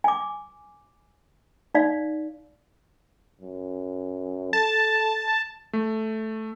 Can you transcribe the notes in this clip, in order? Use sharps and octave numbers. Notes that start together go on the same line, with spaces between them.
G#5 D6
D#4 D5 F5
F#2
A4 A5
A3